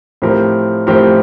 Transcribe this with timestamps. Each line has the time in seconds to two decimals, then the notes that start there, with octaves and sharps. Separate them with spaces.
0.22 A2 F3 C4 G4 A#4
0.87 A2 F3 C4 G4 A#4